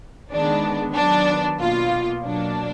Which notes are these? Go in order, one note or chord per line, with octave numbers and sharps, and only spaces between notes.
D#3 G#3 B3 D4
D#3 F#3 B3 D4
B2 A#3 F4
B2 F#3 A#3 D4